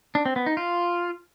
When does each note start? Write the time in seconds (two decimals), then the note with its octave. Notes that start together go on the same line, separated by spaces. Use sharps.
0.15 D4
0.26 C4
0.36 B3
0.46 D#4
0.57 F4